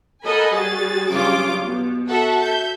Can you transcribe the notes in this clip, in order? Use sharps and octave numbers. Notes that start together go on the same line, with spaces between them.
A4 A#4 D#5 F#5 G#5 B5
G3 F#4 G#4 A6
G2 C#3 F#3 F4 D6
B2
F#4 A4 E5 F#5
E5 G6